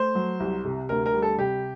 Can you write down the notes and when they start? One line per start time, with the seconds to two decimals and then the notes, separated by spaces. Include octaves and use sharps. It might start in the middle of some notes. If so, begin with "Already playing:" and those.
Already playing: A3 C5
0.15 F#3
0.40 C2
0.65 C3
0.89 D2 A#4
1.06 A#4
1.14 G3
1.22 A4
1.38 C3 G4